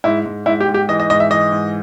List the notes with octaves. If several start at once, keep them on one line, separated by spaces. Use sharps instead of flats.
G#2 E4
G#2
G#2 E4
G4
G#2
G4
E3 D#5
D#5
G#2 D#5
E5
E3 D#5
G#2